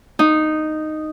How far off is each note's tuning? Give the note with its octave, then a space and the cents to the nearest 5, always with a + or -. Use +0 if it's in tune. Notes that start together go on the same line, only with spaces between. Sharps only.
D#4 -10